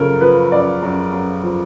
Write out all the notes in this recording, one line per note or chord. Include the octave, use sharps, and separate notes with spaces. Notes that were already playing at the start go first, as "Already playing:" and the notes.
Already playing: F#2 C#3 F3 A4 A#4
F3 B4
F#2 D5
F#2
F#2
F3